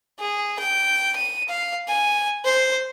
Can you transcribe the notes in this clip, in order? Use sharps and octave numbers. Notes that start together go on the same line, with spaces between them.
G#4
G5
D#7
F5
G#5
C5